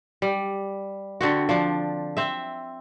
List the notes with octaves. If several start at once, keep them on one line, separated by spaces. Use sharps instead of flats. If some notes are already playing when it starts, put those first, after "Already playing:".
G3
D3 C4 F#4
F3 D4
C4 E5